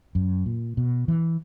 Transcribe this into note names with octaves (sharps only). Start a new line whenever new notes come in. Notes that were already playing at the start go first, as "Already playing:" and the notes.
F#2
A#2
B2
E3